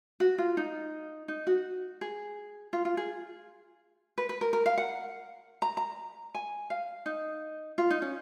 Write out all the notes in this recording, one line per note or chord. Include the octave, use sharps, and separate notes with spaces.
F#4
F4
D#4
D#4
F#4
G#4
F4
F4
G#4
B4
B4
A#4
A#4
F5
F#5
A#5
A#5
G#5
F5
D#4
F4
D#4
C#4